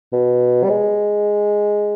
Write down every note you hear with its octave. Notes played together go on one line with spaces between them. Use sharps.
B2
G3
G#3